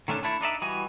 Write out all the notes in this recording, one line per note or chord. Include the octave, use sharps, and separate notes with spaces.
D#3 A3 C#4 D4
A3 D4 E4 A4
D4 D#4 D5 E5
E3 G3 F#4 D#5 G#5